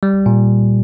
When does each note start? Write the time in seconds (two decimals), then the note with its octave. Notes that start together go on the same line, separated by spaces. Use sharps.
0.03 G3
0.26 A#2